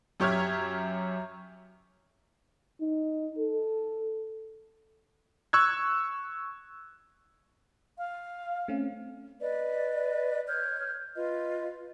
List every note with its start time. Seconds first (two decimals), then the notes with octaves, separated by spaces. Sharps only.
0.20 F#2 G4 C#5 E5 F6 G#6
2.81 D#4
3.39 A4
5.53 C#6 E6 F#6 G#6
7.98 F5
8.68 A3 C4 C#4
9.41 B4 D5 D#5
10.47 C#5 F6 G6
11.15 F4 B4 D#5